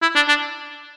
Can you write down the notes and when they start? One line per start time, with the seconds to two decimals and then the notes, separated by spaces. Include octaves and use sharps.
0.02 E4
0.15 D4
0.28 D4